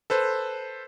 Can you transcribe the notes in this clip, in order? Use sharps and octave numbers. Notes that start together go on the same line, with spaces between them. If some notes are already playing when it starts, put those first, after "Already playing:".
A4 B4 C5